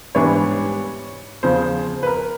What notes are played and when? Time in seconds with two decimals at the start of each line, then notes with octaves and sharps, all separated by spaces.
0.15 G#2 E3 G3 B3 D4 C#5
1.43 E2 C#3 F3 C5
2.03 B4
2.07 A#4